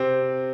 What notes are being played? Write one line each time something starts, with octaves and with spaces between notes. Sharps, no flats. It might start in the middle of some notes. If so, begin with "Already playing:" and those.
Already playing: C3 C4